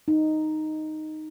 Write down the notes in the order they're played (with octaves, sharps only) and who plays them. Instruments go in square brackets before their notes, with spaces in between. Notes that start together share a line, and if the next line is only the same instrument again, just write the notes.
[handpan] D#4